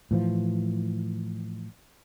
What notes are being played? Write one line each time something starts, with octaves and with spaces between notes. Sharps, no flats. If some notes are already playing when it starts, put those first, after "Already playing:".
A2 E3 F3